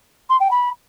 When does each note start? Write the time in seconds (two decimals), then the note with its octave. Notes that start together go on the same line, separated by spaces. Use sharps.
0.29 C6
0.40 G5
0.51 B5